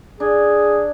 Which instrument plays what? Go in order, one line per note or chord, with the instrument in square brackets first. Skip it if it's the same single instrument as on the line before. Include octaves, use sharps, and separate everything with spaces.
[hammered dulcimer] D4 [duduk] G#4